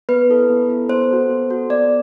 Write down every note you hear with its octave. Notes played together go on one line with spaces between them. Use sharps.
B3 B4
E4 A4
B3
E4 A4
B3 C5
F#4 A4
B3
F#4 A4
B3 D5